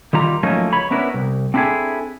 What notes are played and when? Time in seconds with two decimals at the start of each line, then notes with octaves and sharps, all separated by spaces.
0.13 D#3 G3 F4 A#5
0.43 F3 F#3 A3 A#3 C#4 D#4
0.73 C#2 C#5 B5
0.91 B3 C#4 D4 E4 A#4 B4
1.14 C2
1.54 C4 D4 E4 F4 G#4 A4